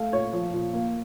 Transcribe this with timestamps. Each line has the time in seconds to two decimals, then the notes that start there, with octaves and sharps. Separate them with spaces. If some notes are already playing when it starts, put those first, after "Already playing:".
Already playing: A3 F5
0.12 A#2 C#5
0.33 F3
0.53 A#2
0.73 A#3